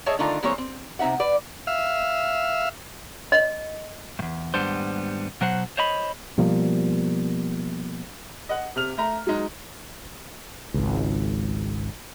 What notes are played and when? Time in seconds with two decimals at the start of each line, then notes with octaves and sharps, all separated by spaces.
0.06 G#4 C#5 D#5 E5 G5 A5
0.19 D3 D#3 A3 D4 D#4 F4
0.43 E3 G#3 A#3 C4 C5 C#5
0.58 C4
0.99 C3 C4 D#4 E5 F#5
1.20 B4 D5
1.67 E5 F5
3.32 D#5
4.19 E2 G2
4.54 D#2 G#2 G3 B3 D4 C5
5.41 B2 F#3 C5 F#5
5.77 C5 C#5 D#5 B5
6.38 B2 F3 G3 A#3
8.49 D#5 F#5
8.76 C3 F6 F7
8.98 A3 A#5
9.27 F#3 G#3 D#4
10.74 G#1 C#2